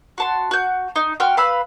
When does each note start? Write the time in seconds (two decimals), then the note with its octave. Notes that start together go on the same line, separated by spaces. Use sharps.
0.18 F#4 A5 C6
0.51 F#4 G6
0.96 D#4
1.20 F#4 G5 C6 F6
1.37 B4 F5 B5 E6